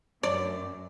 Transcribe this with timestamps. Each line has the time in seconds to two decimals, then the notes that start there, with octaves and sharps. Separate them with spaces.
0.23 F#2 D5